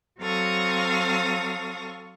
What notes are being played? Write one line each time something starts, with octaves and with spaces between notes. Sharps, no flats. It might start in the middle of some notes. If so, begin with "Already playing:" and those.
F#3 C4 A4 F5 C#6 D#6